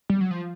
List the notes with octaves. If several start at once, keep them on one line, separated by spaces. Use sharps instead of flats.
G3
F#3
F3